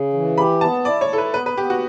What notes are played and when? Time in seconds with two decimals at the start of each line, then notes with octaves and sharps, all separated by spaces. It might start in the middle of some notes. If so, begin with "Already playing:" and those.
Already playing: C#3
0.13 E3
0.38 G4 B5
0.61 B3 A5
0.85 E4 D5
1.01 C#5
1.09 E4 A4
1.18 B4
1.34 B3 B4
1.46 B4
1.57 B3 G4
1.70 F#4